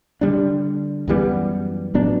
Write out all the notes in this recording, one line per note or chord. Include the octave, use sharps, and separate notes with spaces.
D3 G3 D4
F#2 E3 G3 B3
A2 F#3 B3 D4